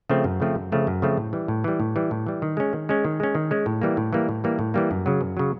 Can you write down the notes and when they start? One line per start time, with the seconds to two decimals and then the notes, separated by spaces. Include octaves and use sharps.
0.09 C#3 F3 A3 C4
0.24 F#2
0.40 C#3 F3 A3 C4
0.55 F#2
0.72 C#3 F3 A3 C4
0.87 F#2
1.02 C#3 F3 A3 C4
1.17 A2
1.33 E3 G3
1.48 A2
1.64 E3 G3
1.80 A2
1.96 E3 G3
2.11 A2
2.27 E3 G3
2.42 D#3
2.57 G#3 C#4
2.73 D#3
2.89 G#3 C#4
3.05 D#3
3.20 G#3 C#4
3.35 D#3
3.51 G#3 C#4
3.66 A2
3.82 E3 G3 A#3
3.97 A2
4.13 E3 G3 A#3
4.29 A2
4.44 E3 G3 A#3
4.59 A2
4.74 E3 G3 A#3
4.91 F#2
5.06 C#3 F#3
5.21 F#2
5.37 C#3 F#3